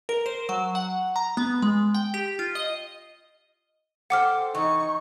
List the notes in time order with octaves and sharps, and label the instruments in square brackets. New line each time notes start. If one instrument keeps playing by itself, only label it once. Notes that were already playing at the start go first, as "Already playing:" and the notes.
[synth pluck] A#4
C5
F#3
F#5
A#5
B3
G#3
G5
G4
F4
D#5
[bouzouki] A4 C5 G5 [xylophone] F#5 D6 F6
[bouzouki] E3 [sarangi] D#4 [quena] C#6